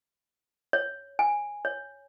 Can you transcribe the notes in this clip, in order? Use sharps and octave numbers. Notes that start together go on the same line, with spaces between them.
C#5
G#5
C#5